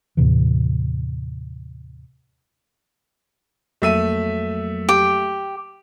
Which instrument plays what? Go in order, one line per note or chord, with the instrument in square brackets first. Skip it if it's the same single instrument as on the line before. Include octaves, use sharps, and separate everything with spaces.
[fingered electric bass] D#2 A2 C3 E3
[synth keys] F2 F#3 A#3 [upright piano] A3 E5 D#7
[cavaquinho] G4